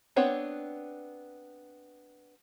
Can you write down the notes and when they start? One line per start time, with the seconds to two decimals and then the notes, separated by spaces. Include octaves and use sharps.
0.16 B3 C4 D4 C#5